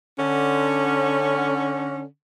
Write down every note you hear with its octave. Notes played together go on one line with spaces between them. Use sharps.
D3 C#4